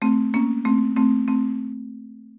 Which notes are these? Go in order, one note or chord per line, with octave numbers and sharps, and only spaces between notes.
A3 C4
A#3 C#4
A3 C4
A3 C4
A3 C4